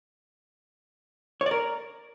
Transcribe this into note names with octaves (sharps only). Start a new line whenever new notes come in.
C#5
D5
A#4